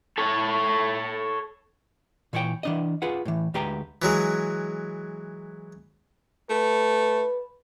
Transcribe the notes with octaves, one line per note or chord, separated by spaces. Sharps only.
A4 C#5
A#2 E3 C#5 D5 G5
E3 D4 D#5
F4 G#4 B4 F#5
A2 E3
D2 G#3 G4 B4 G5 A#5
E3 F#3 G#3
A3 B4